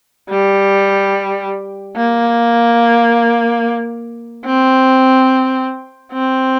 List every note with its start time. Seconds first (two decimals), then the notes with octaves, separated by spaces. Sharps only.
0.29 G3
1.96 A#3
4.46 C4
6.13 C4